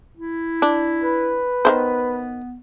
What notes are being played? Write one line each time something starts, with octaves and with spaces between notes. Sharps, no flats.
E4
D4
B4
D#3 E3 B3 C5